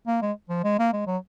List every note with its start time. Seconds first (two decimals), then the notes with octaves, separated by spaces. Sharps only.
0.07 A#3
0.22 G#3
0.49 F3
0.64 G#3
0.79 A#3
0.93 G#3
1.07 F#3